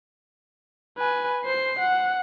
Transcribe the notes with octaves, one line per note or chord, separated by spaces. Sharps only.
B4 G#5
C5 C7
F#5